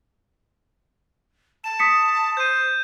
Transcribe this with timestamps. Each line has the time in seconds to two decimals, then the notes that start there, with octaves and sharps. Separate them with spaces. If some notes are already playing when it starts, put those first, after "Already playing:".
1.64 A5 E7
1.79 D#6 B6 C#7
2.37 C5 G6 D#7